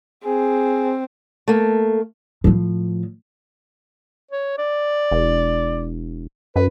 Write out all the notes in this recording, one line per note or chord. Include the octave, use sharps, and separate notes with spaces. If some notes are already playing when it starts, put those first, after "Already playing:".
C4 G#4
A3 A#3
A2 F3
C#5
D5
E1
F#2 B4